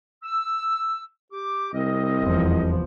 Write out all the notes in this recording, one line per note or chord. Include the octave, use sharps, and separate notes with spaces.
E6
G4 D6
C2 C4 A#4 D#5
F1 E2 F3